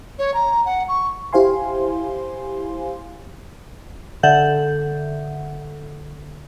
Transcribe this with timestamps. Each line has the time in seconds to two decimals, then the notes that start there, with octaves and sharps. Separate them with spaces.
0.18 C#5
0.34 A#5
0.65 F#5
0.88 C#6
1.33 E4 G4 C5 F5 G#5 C6
4.23 D3 A4 E5 F#5 G6